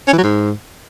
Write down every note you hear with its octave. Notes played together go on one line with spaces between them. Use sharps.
C#4
E3
F#3
G#2